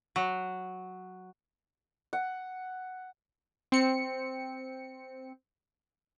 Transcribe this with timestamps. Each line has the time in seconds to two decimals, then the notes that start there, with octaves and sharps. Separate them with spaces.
0.16 F#3
2.13 F#5
3.72 C4 C#7